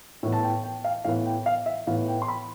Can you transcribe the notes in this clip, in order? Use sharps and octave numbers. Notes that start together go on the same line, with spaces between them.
A2 E3 B3
A5
G5
G5
F5
A2 E3 B3 F5
G5
F5
E5
A2 E3 B3 F5
G5
C6
B5